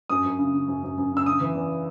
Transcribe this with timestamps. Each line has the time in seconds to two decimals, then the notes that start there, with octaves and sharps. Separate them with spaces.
0.10 F#2 D#6
0.25 F#2
0.39 C#3
0.54 C#3
0.68 F#2
0.83 F#2
0.98 F#2
1.12 C#3 E6
1.26 C#3 D#6
1.41 E3
1.55 E2